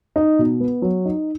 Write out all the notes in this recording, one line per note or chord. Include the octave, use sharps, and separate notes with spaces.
D#4
B2
B3
F#3
D#4